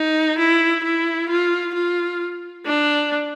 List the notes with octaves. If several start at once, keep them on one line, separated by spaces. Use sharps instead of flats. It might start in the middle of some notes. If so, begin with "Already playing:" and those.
Already playing: D#4
E4
E4
F4
F4
D4